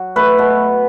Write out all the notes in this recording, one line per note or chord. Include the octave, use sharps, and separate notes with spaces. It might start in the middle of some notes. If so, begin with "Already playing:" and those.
Already playing: F#3 F#4
A3 B4
B2